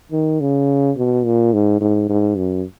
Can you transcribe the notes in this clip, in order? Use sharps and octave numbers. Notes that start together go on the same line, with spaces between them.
D#3
C#3
B2
A#2
G#2
G#2
G#2
F#2